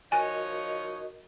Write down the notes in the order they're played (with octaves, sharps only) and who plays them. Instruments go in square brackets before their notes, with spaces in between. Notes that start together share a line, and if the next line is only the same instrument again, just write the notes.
[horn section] F3 D#4 C#5 [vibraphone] F#4 A#4 D#5 [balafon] G#5